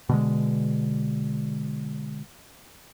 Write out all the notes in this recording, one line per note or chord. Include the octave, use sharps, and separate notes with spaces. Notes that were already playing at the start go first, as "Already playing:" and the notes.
B2 D3 G#3